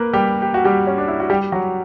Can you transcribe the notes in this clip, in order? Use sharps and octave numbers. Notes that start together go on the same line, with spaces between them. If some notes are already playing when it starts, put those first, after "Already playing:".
Already playing: A#3 A#4 B4
G3 G4
G4
F#4
G3 G4
C#4
D4
E4
F#4
G3 G4
F#3 F#4